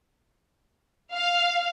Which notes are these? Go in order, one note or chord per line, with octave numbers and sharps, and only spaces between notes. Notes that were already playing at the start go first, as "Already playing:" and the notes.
F5